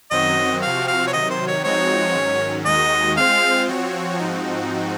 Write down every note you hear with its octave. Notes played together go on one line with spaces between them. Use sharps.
F#2 D#3 F#3 C4 F#4 D#5
C3 F3 C4 F#4 F5
F5
C#5
C3 D#3 F#3 D#5
C5
C#5
F3 G#3 C4 D#4 F#4 C#5
G#2 D#3 F#3 C#4
D#2 D#3 G#3 D#4 F#4 D#5
G#3 C4 F4 C5 F5
F3 C4 F#4 C#5
G#2 F3 C4 D#4 F#4